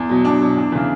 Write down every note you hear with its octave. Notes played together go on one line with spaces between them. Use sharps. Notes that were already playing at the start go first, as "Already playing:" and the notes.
Already playing: E2
B2 F#3
E2 D4
B2 F#3
E2
C#3 E3